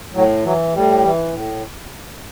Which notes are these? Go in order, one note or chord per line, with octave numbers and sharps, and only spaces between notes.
A2 F#3
E3 F#3
A2 G3
E3
A2